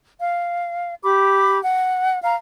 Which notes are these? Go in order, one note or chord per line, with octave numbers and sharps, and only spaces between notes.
F5
G4 B5 D6
F#5
F5 A#5